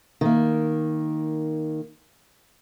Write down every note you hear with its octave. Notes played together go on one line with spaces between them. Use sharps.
D#3 A#3